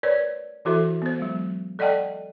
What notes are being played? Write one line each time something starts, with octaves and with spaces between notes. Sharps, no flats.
A#4 B4 C#5 D5
E3 E4 F#4 A4 C5 E5
B3 C5
F#3 G#3
A4 D5 D#5 F#5 G5 A5